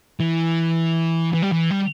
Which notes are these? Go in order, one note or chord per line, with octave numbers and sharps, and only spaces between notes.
E3
E3
G3
E3
G3